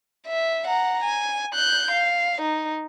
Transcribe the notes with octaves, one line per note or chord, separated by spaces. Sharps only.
E5
F#5 A#5
G#5
F#6 G6
F5
D#4